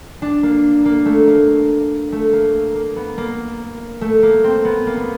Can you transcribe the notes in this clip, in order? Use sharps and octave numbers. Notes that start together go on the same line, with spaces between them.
D4
A#3
A#3
A3
A#3
A3
A#3
A#3
B3
A#3
A3
A#3
C4
B3
A#3
B3